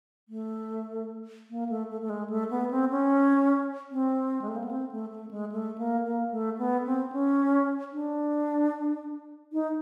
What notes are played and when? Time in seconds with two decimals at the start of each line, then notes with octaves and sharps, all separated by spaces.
0.29 A3
1.50 A#3
1.69 A3
1.91 A3
2.01 A3
2.10 G#3
2.30 A3
2.51 B3
2.71 C4
2.91 C#4
3.91 C4
4.42 G#3
4.48 A3
4.56 A#3
4.64 B3
4.71 C4
4.91 A3
5.11 A3
5.31 G#3
5.52 A3
5.78 A#3
6.05 A#3
6.31 A3
6.59 B3
6.86 C4
7.12 C#4
7.93 D4
9.53 D#4